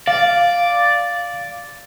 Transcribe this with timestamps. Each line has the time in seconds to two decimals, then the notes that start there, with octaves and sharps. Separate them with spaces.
0.08 D5 F5